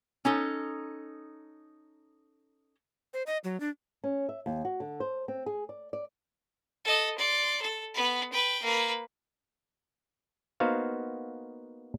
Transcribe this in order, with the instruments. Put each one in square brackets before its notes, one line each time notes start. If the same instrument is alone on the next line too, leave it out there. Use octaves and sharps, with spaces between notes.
[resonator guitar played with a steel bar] C#4 D#4 A4
[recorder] C5
D#5
F#3
D4
[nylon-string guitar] C#4
E5
D#2
F#4
D3
C5
C4
G#4
D5
D5
[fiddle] A4 D#5
D5 C6
A4
B3 B4
B4 G5
A#3 B4
[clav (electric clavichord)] A#3 B3 D#4 F#4 C5 F5